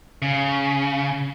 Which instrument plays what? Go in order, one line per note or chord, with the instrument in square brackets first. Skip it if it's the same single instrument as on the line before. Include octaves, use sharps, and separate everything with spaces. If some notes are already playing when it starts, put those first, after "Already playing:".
[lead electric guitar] C#3